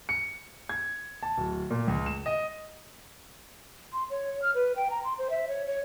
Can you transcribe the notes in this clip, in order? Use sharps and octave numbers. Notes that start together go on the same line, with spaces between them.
C#7
G#6
A5
D1
A#2
C#2
E7
D#5
C6
C#5
F6
B4
G5
A#5
C6
C5
E5
C#5
C#5